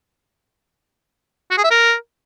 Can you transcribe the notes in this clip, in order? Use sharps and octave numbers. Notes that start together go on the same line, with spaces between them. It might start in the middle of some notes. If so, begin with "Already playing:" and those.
F#4
G#4
E5
A#4